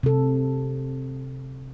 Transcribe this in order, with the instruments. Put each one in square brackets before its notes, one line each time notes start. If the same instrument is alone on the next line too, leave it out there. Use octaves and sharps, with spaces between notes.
[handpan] C3 A4